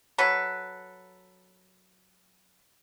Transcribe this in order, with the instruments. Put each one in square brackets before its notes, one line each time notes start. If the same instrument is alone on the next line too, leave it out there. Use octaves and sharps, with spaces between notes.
[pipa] F#3 A4 B4